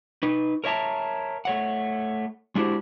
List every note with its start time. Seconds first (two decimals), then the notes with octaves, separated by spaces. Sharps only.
0.23 D#4 B4
0.64 A#4 C#5 E5 A5 A#5
1.45 A3 C#5 F#5
2.55 G#3 D4 E4 F#4 G4 C5